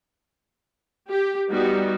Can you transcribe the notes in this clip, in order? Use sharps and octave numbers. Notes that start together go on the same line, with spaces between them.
G4
G3 B3 D#4 F#4